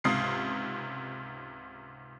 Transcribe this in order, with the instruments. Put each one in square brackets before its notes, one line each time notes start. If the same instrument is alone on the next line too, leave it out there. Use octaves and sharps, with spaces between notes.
[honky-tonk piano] C#2 G#2 C3 D#6 C7